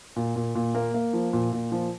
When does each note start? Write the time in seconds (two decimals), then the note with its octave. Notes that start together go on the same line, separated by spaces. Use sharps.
0.16 A#2
0.36 A#2
0.55 A#2
0.75 A#3
0.94 A#3
1.13 F3
1.33 A#2
1.53 A#2
1.72 F3